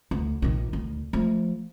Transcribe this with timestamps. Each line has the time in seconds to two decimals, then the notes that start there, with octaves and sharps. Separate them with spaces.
0.11 D2
0.42 A#1 D#3
0.73 D2
1.13 F3 A3